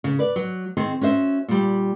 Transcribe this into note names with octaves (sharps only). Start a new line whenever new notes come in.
C#3
B4 D5
F#3
D#3 C4 G#4
C#4 F#4 C5 E5
A#2 G3